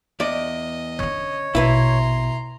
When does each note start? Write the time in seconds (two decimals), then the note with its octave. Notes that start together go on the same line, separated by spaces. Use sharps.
0.20 E2 D5 D#5
0.99 D3 C#4 C#5
1.55 A#1 B2 E4 B4 E5 A#5 C6